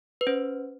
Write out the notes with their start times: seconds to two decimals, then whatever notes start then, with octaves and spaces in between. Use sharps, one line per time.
0.21 B4
0.27 C#4 C5